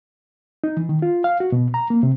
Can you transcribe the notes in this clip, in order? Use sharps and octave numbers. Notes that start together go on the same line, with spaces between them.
D#4
E3
D#3
F4
F5
F#4
B2
A#5
A#3
C3